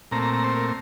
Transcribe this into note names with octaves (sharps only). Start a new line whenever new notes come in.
A#2 A3 C4 A#5
A#5
A#5
C5
A#4